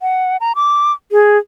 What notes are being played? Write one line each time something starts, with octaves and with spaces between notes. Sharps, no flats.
F#5
A#5
D6
G#4